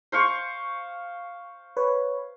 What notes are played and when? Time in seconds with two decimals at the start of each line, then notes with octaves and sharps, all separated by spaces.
0.12 C5 F5 C#6
1.77 B4 C#5